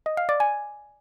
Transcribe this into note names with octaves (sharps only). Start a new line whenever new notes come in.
D#5
F5
D5
G#5